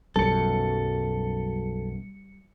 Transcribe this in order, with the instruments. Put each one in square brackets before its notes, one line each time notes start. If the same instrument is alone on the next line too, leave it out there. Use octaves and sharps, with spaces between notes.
[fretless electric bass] B1 F#2 [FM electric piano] G3 C#7 [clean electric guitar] A4